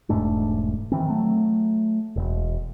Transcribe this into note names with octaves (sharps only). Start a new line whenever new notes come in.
E1 G#2 A3 D4
D#3 E3 C4
F#3 A3
E1